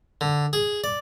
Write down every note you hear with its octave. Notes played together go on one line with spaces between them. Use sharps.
D3
G#4
D5